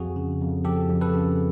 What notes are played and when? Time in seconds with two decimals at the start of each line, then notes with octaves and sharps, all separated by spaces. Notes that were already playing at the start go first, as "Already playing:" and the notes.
Already playing: F2 F#4 G#4
0.16 C#3
0.41 F2
0.65 F3 G4 A4
0.89 F2
1.01 A4 B4
1.14 C#3